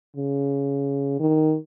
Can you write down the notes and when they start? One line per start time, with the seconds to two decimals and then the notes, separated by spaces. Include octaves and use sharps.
0.16 C#3
1.19 D#3